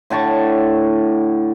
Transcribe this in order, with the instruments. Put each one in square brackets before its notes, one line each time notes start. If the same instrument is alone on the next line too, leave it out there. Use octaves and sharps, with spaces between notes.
[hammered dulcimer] A2 D3 A5 C#6